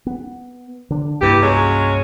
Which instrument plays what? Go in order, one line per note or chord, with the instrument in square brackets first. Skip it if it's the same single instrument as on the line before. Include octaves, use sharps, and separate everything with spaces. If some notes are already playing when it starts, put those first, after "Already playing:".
[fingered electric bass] B3
D3 D4
[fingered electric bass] C2 G2 A#3 [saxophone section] E3 G4
[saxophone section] F#3 G#3 C#4